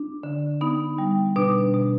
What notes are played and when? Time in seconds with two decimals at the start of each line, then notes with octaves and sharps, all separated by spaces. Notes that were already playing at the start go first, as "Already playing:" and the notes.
Already playing: D4
0.23 D3
0.61 B3 D#4
0.98 G3
1.36 B2 D4
1.74 B2